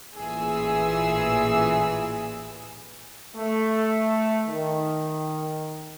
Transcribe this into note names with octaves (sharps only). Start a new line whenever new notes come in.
A1 A#2 E3 G#4 E6
A3
D#3